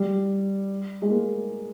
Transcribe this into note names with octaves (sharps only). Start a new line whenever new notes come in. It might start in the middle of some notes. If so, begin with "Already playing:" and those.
Already playing: G3
G#3
A#3